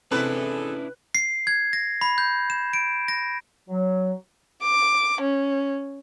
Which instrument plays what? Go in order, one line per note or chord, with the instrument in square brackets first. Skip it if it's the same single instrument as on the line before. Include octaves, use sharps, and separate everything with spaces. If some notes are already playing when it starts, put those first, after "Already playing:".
[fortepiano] C3 [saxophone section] E3 G#4 A4 [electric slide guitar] C#4 D4 E4 [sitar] B4
[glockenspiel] C7
G#6
A#6
B5
G6
E7
D7
A#6
[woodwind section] F#3
[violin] D6
C#4